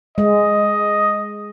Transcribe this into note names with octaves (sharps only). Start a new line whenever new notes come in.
G#3 D#5